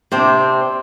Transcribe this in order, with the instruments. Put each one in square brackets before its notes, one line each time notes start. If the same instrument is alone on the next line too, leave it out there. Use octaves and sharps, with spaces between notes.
[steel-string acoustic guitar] C3 C4 D4